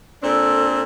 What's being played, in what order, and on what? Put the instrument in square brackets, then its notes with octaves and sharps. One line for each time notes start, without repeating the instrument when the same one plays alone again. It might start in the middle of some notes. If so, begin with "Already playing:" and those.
[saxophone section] A#2 C4 D4 [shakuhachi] A4